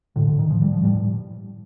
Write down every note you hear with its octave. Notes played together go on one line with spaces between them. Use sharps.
A2 D3
D3
D#3
A2 F3
G3
F3
A2 G3